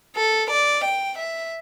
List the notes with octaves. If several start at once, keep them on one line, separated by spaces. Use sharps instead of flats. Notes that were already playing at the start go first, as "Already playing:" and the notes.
A4
D5
G5
E5